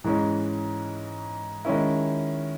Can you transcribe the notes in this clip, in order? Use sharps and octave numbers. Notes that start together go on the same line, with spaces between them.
G#2 E3 G#3 C#4
D#3 G#3 C#4 E4